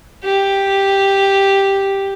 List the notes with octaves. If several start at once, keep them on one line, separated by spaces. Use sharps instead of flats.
G4